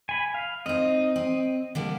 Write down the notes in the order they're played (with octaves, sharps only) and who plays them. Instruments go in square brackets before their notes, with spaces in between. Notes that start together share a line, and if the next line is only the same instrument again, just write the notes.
[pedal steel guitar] G#5 B5
F5
[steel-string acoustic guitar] C4 D#4 [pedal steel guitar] D#5
[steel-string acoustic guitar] C4
D3 G3 A#3